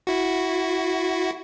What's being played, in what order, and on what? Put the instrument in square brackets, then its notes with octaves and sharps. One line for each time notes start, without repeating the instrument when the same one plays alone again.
[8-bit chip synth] E4 F#4